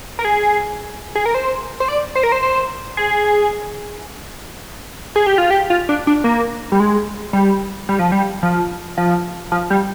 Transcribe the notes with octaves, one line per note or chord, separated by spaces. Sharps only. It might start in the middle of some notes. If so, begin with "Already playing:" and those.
A#4
G#4
G#4
A#4
C5
C5
D5
C5
A#4
C5
C5
G#4
G#4
G4
F4
G4
F4
D4
D4
A#3
G3
G#3
G3
G3
F3
G3
F3
F3
F3
G3